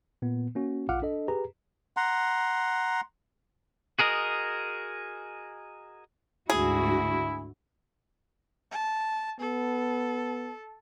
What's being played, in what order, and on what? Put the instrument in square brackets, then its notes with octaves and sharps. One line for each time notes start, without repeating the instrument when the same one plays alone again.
[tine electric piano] A#2 B3
A#3 C#4 F#4
A#1 F4 F5 F#5 D6 F6
D4 A4 D#5
G4 G#4 B4 A#5
[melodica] F#5 A#5 C6
[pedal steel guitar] F#4 G#4 A#4 D#5
[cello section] D2 G#2 F#4 [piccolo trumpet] E4 [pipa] G#4
[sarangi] A5
[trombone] B3 [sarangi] A4